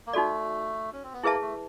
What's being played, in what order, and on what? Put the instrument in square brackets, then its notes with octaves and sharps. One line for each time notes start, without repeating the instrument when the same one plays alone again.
[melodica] A#3
[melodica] A3 [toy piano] D#4 F#4 A4 D5
[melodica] C#4
C4
B3
[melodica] A#3 [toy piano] E4 G#4 B4 E5 A5
[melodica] A3